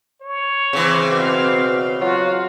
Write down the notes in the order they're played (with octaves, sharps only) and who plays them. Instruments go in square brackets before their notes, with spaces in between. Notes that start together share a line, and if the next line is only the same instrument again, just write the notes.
[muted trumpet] C#5
[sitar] C#3 E3 [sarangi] C4
[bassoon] B2 [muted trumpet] F5
[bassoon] F#3 [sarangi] F4 [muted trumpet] F#4